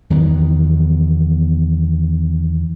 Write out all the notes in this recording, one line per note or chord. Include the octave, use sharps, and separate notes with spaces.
E2 D#3 F#3 B3